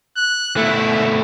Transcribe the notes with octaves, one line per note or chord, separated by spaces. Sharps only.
F#6
B2 A3 E4